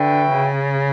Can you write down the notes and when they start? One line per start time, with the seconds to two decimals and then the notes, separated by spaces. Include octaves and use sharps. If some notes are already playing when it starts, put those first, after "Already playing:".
Already playing: D3 F#4 B4 E5 G5
0.31 C#3